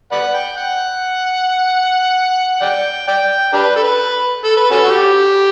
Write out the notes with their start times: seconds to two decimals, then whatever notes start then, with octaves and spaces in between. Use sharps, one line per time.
0.12 B4 D5 F#5
0.34 G5
0.57 F#5
2.61 D5 G5
3.08 D5 G5
3.54 D4 G4 B4
3.76 A4
3.84 B4
4.44 A4
4.57 B4
4.71 C#4 F#4 A4
4.84 F#4
4.90 G4